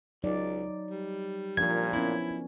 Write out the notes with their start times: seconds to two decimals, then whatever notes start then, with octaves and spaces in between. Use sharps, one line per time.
0.24 C#2 F#3 D#4 D5
0.91 G3
1.57 A#2 F3 D4 A#4 G#6
1.93 B3 C#4 E4